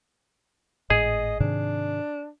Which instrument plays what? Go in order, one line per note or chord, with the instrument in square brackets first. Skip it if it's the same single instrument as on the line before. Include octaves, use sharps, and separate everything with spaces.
[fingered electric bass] G#1 A2 [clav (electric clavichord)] G#4 [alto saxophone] D#5
[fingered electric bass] G#2 C3 D#3 [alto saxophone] D4